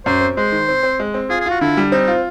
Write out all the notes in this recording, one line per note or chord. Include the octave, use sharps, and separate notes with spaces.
F#2 C5
C4
G#3 C5
D#3
C4
C4
G#3
C4
F4 G#4
G#4
F4 F#4
D3 E4
G3
C4 D#4
F4